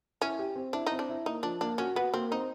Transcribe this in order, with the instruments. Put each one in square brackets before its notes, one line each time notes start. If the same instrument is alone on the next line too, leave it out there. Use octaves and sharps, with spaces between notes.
[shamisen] C#4 [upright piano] E4
[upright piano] G4
C4
[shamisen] D4 [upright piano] E4
[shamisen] D#4
[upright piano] C4
[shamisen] D4
[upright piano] E4
[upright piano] A#3 [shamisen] D#4
[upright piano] F3 [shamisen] D4
[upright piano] A#3 [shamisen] D4
[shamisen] C#4 [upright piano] F#4
[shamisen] B3 [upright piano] F#4
[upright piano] A#3 [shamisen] C4
[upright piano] C4 [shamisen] D#4